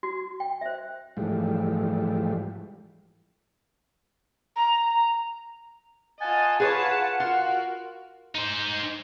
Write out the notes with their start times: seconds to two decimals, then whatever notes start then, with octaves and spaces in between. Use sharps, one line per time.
0.03 F#4
0.40 G5
0.61 C5 E5
1.17 G#2 E3 F3 G3 A3
4.56 A#5
6.20 F4 D#5 F#5 G#5 A5
6.60 F4 G#4 B4 C#5 F#5 A5
7.20 F4 F#4 A#4
8.35 D#4 C5